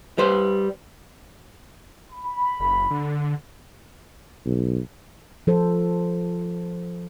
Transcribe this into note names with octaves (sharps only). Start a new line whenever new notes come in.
G3 B4 C5
B5
F#1
D3
B1
F3 A4 C5